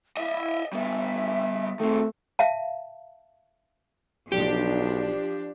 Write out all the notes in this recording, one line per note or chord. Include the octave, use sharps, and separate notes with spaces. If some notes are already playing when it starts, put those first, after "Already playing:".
E4 D#5 E5
G3 B3 E5
D#3 A3 C4
E5 F5 A5
B1 F3 D4 G4